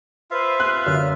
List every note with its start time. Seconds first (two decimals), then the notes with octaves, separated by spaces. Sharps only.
0.31 F4 B4 C5 E5 F5
0.60 F#6
0.87 F#2 D3 F6